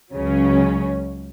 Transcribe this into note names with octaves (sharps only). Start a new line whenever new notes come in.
C#2 C#3 F#3 C#4